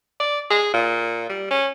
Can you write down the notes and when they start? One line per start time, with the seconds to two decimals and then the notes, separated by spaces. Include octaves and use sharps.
0.20 D5
0.51 G#4
0.74 A#2
1.30 G3
1.51 C#4